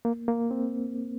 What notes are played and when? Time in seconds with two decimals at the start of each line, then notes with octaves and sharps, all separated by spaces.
0.05 A#3
0.28 A#3
0.51 C4